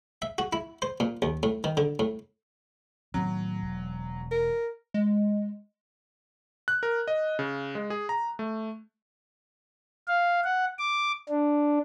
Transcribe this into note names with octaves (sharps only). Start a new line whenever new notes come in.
E5
F#4
E4
C5
A#2
D#2
A2
D#3
D3
A2
A2 D#3 F#3 B3
E1
A#4
G#3
F#6
A#4
D#5
C#3
G#3
G#4
A#5
A3
F5
F#5
D6
D4